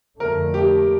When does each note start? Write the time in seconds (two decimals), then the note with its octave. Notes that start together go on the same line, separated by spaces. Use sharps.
0.20 F2 D3 A3 A#4
0.54 G4